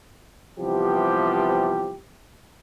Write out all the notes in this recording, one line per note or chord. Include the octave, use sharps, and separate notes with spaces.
C3 E3 F3 G3 B3 G4